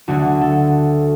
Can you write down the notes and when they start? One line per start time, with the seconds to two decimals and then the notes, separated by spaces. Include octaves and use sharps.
0.08 D2 D3 A3 F#4
0.41 A4